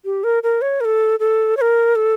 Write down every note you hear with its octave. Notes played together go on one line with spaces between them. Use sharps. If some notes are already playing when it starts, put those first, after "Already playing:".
G4
A#4
A#4
C#5
A#4
A4
A4
C#5
A#4
A4